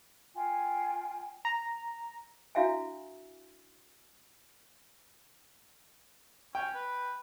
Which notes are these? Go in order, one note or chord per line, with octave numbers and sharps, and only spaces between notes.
F4 G5 G#5
A#5
D4 E4 F#4 E5 F5 G#5
C#4 G5
B4